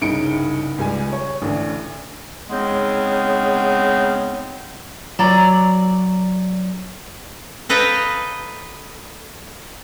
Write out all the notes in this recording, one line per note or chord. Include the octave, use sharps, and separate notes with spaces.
C2 G2 C#3 D#4 C#7 D7
C#2 G3 G#5
C#5
A1 D2 D4
C#3 G#3 B3 C4 D#4
F#3 D5 A#5
A4 B4 D#5 F5 G5 A#5